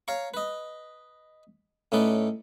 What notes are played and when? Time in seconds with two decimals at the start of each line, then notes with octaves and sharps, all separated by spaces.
0.08 C#5 F5 A#5 C#6
0.34 B4 D#5
1.92 A2 A3 C#4 D#4 B4 D5